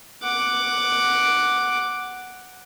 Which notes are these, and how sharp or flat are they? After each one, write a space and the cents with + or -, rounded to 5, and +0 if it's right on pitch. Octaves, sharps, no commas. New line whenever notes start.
F#5 +0 D6 +0